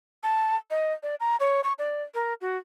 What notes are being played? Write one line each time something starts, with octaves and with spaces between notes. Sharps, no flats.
A5
D#5
D5
A#5
C#5
C#6
D5
A#4
F#4